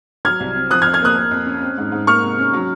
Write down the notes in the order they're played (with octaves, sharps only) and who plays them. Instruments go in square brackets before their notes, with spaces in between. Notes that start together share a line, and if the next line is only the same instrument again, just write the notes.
[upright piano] F#3 F6 G#6
C2
C4
F3 D#6 F#6
F6 G#6
F2
F6 G#6
A#3 D#6 F#6
A#3
F2
C#4
C4
G#2
G#2
A#3 C#6 F6
C3
C#4
F#3